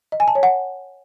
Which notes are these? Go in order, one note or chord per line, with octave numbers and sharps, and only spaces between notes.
D#5
G#5
A5
C#5
F#5